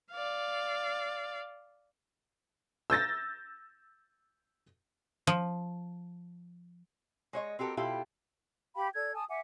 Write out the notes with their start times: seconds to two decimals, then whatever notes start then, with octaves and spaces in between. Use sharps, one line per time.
0.11 D5 F5
2.90 E6 G6 A6 A#6
5.27 F3
7.33 G#3 C#5 D#5
7.59 C4 F#4 G4 A4 A#4
7.77 B2 E4 F4 G4 A4
8.75 G4 F5 G5 B5
8.94 A4 D5 G#6
9.14 G#5 A5 D#6
9.29 E5 F#5 G#5 D6